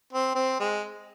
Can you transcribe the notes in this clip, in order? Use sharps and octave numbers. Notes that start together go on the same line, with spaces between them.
C4
C4
G#3